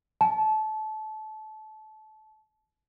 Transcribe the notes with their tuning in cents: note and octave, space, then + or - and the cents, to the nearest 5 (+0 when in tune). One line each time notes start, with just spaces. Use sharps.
A5 -25